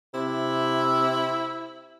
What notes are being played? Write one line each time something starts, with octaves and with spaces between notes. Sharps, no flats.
C3 E4